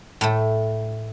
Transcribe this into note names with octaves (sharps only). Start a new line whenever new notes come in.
A2 A3